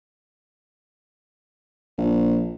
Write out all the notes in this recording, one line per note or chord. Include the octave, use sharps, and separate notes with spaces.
A#1